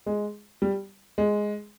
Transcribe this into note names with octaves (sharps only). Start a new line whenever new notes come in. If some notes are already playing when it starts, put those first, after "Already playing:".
G#3
G3
G#3